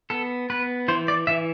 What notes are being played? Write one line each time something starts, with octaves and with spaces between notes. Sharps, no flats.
B3 A4
B3 B4
E3 C5
D5
E3 E5